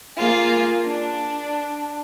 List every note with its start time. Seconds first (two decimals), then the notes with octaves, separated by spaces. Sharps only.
0.18 A#3 F4 G#4
0.86 D4